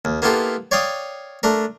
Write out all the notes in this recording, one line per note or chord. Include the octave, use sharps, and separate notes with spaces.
D#2
A#3 B3 E4 F4 G4 A4
C#5 D5 F5 G5 D#6
A3 D4 A#4